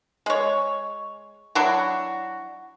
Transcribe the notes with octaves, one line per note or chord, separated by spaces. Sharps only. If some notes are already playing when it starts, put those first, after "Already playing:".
G#3 C#5
F#3 D4 E4 F#4